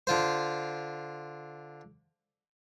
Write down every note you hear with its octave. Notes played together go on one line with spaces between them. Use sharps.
D3 F4 C5